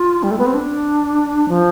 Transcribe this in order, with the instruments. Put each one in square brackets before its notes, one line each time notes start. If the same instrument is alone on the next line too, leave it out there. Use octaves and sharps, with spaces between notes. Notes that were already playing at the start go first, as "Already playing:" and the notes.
Already playing: [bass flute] F4
G3
A3
B3
C4
D4
F3